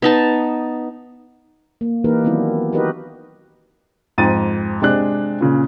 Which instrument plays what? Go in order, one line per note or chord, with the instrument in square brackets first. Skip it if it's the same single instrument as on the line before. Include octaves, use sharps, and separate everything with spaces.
[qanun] B3 D#4 A5
[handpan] A#3
E3 A#3 D#4 G4 A#4 B4
D#3 F#3 B3 C4 D4 E4
D#4 F#4 G4 A#4 B4 D#5
[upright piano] F2 G#2 A6 D#7
C3 G#3 D4 F#6
A#2 C#3